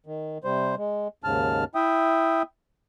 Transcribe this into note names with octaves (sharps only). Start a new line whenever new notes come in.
D#3
C3 G3 C5
G#3
D#2 G#2 C#3 A5 F6
E4 E5 G5 D#6